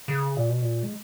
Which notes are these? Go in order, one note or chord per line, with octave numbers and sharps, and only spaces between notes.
C#3
A#2
B2
A#2
G#3